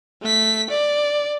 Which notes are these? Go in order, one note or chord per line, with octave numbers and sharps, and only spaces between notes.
A3 B6
D5